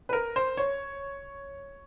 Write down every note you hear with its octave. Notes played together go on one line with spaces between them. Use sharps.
B4
A#4
C5
C#5